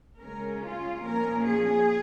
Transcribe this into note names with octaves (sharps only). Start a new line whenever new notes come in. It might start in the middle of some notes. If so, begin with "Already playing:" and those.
C#3 G#3 C#4 A#4
F4
A#2 F3 C#4 A#4
G#4